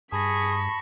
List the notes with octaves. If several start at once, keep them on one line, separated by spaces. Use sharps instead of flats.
G2 G#4 A5 B5 C#6 A#6 B6